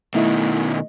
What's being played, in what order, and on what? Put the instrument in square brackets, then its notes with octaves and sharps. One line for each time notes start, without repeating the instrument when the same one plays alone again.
[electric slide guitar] B2 D#3 [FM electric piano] A3 E4 D#5